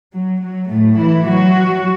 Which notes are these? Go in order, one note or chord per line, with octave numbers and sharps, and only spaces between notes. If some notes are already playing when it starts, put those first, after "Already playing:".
F#3
F#3
A2 A3
E3 E4
F#3 F#4